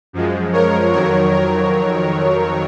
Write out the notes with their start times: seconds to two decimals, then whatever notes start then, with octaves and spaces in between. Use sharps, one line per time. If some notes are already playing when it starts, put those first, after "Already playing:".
0.13 F#2 F3 G#3
0.53 A#4 C#5
0.92 F2 D#3 F#3 A#4 C#5
1.32 A#4